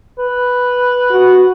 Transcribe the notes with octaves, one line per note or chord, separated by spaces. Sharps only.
B4
F#4